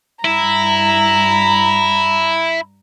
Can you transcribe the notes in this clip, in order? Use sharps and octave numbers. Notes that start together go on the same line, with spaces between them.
G2 E4 A#5